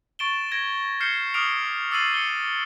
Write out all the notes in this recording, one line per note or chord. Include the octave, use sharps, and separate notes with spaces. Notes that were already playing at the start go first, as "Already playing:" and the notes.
C#6 A6 D7 E7 G7
G#6 A#6 D7
F6 G6 C7 C#7 E7 G7
D6 D#6 F6 C7 D7 F7
D6 E6 A6 C7 D#7 F#7
C#7 G7